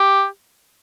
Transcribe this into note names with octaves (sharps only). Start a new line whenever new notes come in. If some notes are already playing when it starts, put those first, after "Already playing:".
Already playing: G4